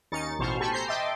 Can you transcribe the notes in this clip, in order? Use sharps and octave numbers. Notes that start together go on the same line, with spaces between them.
D#2 C#4 D#4 A6 C#7
A1 B2 C5 C#6 F6
G4 A4 G#5 A5 B5 C#6
C5 A#5 C6 G6 C7
D#5 E5 G5 A5 C6 D6